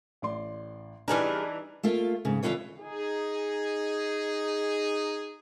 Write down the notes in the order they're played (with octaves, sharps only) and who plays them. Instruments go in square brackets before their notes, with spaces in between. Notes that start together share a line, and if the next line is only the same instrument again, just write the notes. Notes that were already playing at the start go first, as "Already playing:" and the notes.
[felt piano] A1 D5 C6
[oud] E3 D4 [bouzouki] G3 G#4 A#4 [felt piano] D#4 B4
[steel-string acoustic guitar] A3 A#3 F4
G#2 C#3
E2 D3 B3 F4 B4 C#5
[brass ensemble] D#4 G#4